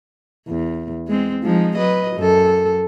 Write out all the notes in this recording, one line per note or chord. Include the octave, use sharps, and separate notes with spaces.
E2
G#3 C4
F3 G#3 D#4
F#3 B4 D#5
F#2 A4